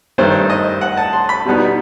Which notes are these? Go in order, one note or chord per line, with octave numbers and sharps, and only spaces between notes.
G2 D#3 A3 C5
D#5
F#5
A5
C6
B5
B2 G3 B3 D#4